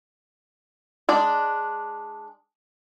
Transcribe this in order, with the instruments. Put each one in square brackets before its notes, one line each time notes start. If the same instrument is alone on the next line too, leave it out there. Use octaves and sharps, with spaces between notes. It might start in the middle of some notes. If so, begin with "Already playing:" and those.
[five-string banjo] G#3 D4 D5